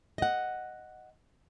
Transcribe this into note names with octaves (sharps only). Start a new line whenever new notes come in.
D#5 F#5